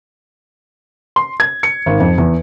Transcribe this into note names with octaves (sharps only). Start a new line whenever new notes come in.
C6
G#6
C#7
G#1
F2
E2